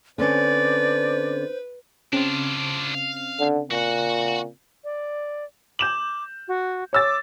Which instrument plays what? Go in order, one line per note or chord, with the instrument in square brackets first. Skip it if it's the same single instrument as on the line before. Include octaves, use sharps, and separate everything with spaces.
[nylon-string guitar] D3 C4 C#4 [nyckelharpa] B4 [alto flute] C5 [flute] D5
[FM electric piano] C#3 C4 [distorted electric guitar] D4 F4
[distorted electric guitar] F5
[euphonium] D3
[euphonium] A#2 [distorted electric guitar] F#4 F#5
[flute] D5
[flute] D6 [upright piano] G6 E7 F#7
[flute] F#4
[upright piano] C#5 E6 A6 [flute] D6